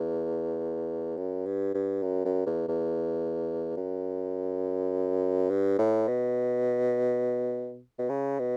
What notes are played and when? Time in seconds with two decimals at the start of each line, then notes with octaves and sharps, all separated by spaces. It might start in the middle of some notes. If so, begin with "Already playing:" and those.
Already playing: E2
1.17 F#2
1.46 G2
1.74 G2
2.03 F#2
2.25 F#2
2.46 E2
2.68 E2
3.77 F#2
5.50 G2
5.78 A2
6.08 B2
7.99 B2
8.09 C#3
8.39 B2